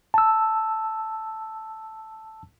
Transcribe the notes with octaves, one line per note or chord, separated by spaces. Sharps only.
A5 E6